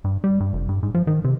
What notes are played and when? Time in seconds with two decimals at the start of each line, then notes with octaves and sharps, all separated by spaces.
0.04 G2
0.24 G3
0.40 G2
0.53 F1
0.69 G2
0.83 G#2
0.95 F3
1.07 D#3
1.24 C3